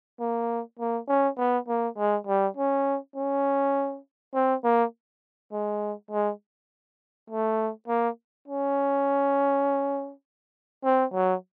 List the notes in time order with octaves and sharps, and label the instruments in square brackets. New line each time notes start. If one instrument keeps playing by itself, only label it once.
[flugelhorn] A#3
A#3
C#4
B3
A#3
G#3
G3
C#4
C#4
C4
A#3
G#3
G#3
A3
A#3
C#4
C4
F#3